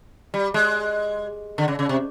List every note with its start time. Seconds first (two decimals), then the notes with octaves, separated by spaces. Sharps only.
0.34 G3
0.54 G#3
1.58 D3
1.68 C#3
1.79 C#3
1.89 C3